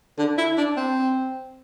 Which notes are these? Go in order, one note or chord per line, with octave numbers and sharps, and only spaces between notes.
D3
E4
D4
C4